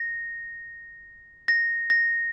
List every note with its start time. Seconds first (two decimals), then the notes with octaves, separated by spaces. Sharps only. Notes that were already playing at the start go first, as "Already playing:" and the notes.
Already playing: A#6
1.48 A#6
1.90 A#6